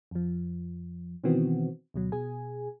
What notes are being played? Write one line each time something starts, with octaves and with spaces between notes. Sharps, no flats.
F2 F3
B2 D#3 E3 B3 C4 F#4
D2 B2 F#3
B2 G#4 G#5